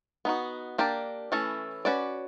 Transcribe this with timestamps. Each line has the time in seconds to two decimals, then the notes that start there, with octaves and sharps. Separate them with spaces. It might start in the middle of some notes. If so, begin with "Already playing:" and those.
0.25 B3 D#4 F#4
0.78 A#3 D4 G4 A#4 D5
1.32 E3 A3 C#4 E4 A4
1.85 C#4 F#4 B4 D5